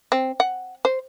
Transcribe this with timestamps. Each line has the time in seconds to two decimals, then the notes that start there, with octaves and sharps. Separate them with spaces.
0.12 C4
0.40 F#5
0.85 C5